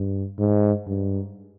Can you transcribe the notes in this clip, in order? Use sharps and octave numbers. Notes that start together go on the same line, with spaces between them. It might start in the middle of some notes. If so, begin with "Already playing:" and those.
Already playing: G2
G#2
G2